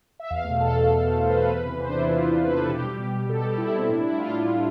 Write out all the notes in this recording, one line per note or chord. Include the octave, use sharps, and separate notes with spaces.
E5
E2 F5
A3
B2
E2 A4
B2 A3
E2
B2 A3
E2 C5
B4
B2 A3 A4
E2 B4
C3 E3
E2 C5
D4
C3 E3 E4
E2 F4
C3 E3
E2 B4
C3 E3 A4
B2 G4
G3
B2
G3
B2 A4
G3 G4
B2 E4
G3 C4
A2 D4
G3 E4
A2 F4
G3
A2